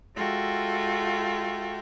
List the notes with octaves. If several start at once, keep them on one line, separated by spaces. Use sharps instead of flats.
G#3 F4 F#4 A4 E5 G5